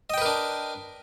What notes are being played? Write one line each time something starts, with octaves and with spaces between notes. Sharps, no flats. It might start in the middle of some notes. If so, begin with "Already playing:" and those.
D4 A#4 B4 D#5 G5